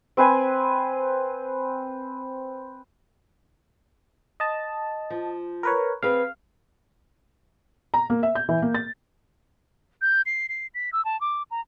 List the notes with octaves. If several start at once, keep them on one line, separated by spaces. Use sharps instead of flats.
C4 B4 C5 G#5
D#5 A5
F3
A#4 B4 C#5
C4 G#4 B4 F5
A#5
A#3
E5
G6
E3
A#3
A6
G6
C7
C7
B6
E6
A5
D6
A#5